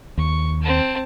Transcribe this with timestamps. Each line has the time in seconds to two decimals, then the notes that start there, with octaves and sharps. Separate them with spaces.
0.18 D#2 C#6
0.62 C4 A5